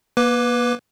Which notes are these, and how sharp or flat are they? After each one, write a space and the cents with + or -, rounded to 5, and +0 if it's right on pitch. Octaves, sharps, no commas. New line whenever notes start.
A#3 +35 B4 +0 D6 +0